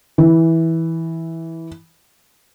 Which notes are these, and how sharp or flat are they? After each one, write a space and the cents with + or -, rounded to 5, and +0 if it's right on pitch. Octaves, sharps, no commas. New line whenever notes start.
E3 -10